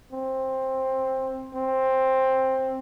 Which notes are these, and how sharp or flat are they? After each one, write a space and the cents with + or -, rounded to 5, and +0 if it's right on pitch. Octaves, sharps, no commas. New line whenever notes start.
C4 +10
C4 +10